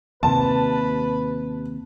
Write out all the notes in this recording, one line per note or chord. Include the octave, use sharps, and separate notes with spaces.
D#2 C3 B4 A5